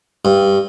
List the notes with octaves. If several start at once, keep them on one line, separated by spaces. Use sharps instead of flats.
G2